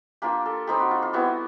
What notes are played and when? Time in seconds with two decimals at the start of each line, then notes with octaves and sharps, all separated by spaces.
0.22 A#3 D4 F4 G4
0.46 A4
0.67 G3 C4 D#4 G4
0.80 F#4
0.91 F4
1.02 F4
1.13 G3 B3 E4 F#4